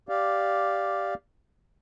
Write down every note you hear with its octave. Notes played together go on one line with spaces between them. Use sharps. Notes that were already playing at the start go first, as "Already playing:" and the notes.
G4 D5 F5